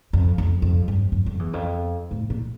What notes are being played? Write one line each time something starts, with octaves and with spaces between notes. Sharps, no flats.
F2
F2
F2
G2
F#2
F2
E2
F2
A2
A#2